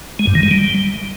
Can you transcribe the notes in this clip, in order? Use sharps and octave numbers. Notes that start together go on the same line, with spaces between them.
G#3
G2
D#3
G#3
G3